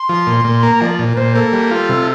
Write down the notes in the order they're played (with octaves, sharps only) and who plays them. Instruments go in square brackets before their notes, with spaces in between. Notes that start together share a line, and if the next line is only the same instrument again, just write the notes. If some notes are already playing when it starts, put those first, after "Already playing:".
Already playing: [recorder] C6
[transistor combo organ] F3
A#2
A#2
[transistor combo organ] A#3 [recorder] A#5
[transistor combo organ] F3 [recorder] D5
[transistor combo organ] A#2
[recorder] A#4
[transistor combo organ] A#2 [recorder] C5
[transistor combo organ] A#3 [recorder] A4
[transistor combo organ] G3
F4
C3